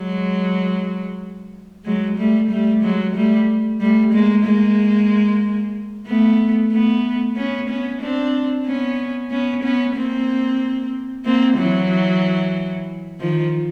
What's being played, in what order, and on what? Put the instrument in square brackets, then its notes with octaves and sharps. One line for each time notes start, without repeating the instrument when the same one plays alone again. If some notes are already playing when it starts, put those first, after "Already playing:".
Already playing: [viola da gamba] F#3 G#3
F#3 G#3
G3 A3
G3 A3
F#3 G#3
G3 A3
G3 A3
G#3 A#3
G#3 A#3
A3 B3
A3 B3
B3 C#4
B3 C#4
C4 D4
B3 C#4
B3 C#4
B3 C#4
A#3 C4
A#3 C4
E3 F#3
D#3 F3